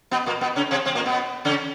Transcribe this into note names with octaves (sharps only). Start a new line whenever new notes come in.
B2 B3
A#2 A#3
B2 B3
C#3 C#4
C3 C4
C3 C4
A#2 A#3
B2 B3
C#3 C#4